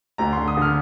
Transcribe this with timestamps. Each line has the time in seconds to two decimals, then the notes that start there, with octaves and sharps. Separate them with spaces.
0.18 D2 A#5
0.33 D3 C6
0.48 D#6
0.57 D3 F6